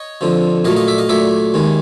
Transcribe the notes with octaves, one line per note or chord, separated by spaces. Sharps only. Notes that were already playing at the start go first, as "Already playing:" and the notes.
Already playing: C#5 D#5
F2 D3 F3
A#2 F#3 A3 D#5 F5
D#5 F5
D5 E5
D#5 F5
A#2 F#3 A3 D5 E5
D#2 D#3 G#3